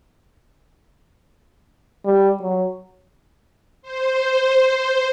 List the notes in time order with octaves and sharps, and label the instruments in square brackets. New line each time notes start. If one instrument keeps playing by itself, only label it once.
[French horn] G3
F#3
[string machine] C5